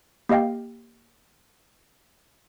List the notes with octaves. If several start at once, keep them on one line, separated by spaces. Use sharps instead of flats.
A#3 G4 D#5 F5 G5